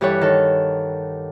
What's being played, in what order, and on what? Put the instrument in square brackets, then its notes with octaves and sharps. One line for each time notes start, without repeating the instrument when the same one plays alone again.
[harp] G2 E3 G4 A4 C#5 F#5
D#3 A4